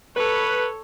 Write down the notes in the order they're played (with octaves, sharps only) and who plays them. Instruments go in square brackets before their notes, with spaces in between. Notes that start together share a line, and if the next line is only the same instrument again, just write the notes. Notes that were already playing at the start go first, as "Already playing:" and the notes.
[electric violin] A4 C#5 [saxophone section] B4